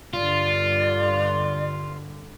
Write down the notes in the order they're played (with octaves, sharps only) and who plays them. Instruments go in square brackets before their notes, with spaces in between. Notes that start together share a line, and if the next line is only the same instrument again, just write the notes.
[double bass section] G2 D3 [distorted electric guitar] F4 [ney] D5